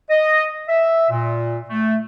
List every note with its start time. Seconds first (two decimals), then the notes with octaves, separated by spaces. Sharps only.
0.10 D#5
0.68 E5
1.10 A#2
1.69 A3